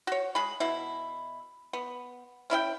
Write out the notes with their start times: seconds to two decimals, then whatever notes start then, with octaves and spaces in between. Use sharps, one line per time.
0.07 F#4 C#5
0.35 G#3 G#4 B5
0.60 B2 E4
1.73 B3
2.50 C#4 E4 E5 G5